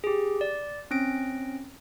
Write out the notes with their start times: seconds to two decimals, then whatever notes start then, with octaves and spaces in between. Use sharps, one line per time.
0.04 G4 G#4
0.41 D5
0.91 C4 C#4 A#6 D7